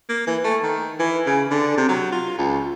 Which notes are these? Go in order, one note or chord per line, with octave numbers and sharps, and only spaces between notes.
A#3
E3
A3
D#3
E3
C#3
D3
C3
F#3
F4
C#2